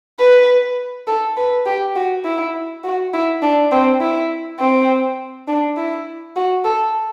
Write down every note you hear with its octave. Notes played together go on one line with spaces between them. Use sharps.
B4
A4
B4
G4
F#4
E4
F#4
E4
D4
C4
E4
C4
D4
E4
F#4
A4